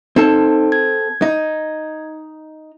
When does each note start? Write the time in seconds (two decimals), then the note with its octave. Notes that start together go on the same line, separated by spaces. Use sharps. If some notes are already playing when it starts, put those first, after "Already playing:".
0.16 C4 D#4 A4
0.72 G#6
1.22 D#4